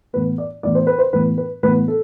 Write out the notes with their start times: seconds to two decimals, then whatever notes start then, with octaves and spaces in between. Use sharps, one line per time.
0.13 A2 E3 B3 B4
0.38 D5
0.63 A2 E3 B3 D5
0.75 C5
0.87 B4
0.98 C5
1.13 A2 E3 B3 B4
1.38 B4
1.63 A2 E3 B3 B4
1.88 A4